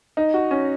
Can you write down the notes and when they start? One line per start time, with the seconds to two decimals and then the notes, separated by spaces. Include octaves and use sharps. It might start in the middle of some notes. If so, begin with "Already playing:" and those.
0.17 D#4
0.34 F#4
0.51 C#4